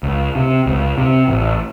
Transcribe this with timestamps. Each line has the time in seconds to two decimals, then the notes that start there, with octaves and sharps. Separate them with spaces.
0.03 C#2
0.35 C3
0.66 C#2
0.98 C3
1.28 A1